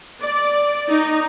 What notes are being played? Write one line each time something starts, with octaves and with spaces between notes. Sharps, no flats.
D5
D#4